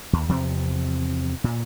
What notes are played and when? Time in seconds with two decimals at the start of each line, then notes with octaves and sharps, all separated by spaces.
0.13 D#2
0.29 E2 C3 F3 C4
1.44 A#2